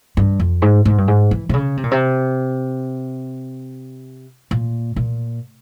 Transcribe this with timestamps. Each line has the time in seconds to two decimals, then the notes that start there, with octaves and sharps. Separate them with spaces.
0.17 G2
0.40 F2
0.62 G#2
0.85 G#2
0.98 G2
1.08 G#2
1.31 E3
1.49 C3
1.54 C#3
1.77 C3
1.84 A#2
1.91 C3
4.51 A#2
4.96 A#2